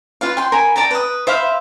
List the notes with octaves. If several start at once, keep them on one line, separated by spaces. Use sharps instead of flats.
F4 B4 F5
G5 C6
A#4 G#5 B5
D5 G5 A5 A#5
B4 D#6
C5 E5 F5 B5